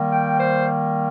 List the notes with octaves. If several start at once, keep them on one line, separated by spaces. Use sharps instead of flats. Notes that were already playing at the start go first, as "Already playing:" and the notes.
Already playing: D#3 G3 A#3
G5
C5